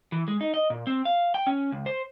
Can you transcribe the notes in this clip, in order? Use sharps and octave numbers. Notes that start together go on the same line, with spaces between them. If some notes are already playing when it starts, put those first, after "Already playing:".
E3
G#3
D#4
D#5
A#2
C4
F5
G5
C#4
C#2
C5